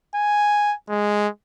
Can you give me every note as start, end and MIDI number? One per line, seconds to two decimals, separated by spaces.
0.15 0.74 80
0.89 1.28 56